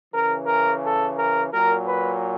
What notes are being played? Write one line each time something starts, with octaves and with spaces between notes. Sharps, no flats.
C#3 E3 A#4
A#4
A4
A#4
A#2 F#3 A#4
B4